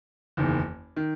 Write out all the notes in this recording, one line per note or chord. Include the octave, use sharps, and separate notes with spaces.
F#1 E2 D#3
D#3